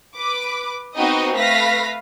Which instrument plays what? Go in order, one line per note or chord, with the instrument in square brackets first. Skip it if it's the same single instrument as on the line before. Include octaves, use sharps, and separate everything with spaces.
[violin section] B4 D6
B3 C4 D#4 F#4 D#5 G5
A3 B4 F5 A#6 B6